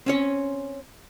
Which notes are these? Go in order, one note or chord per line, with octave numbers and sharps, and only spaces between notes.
C4 C#4 C#5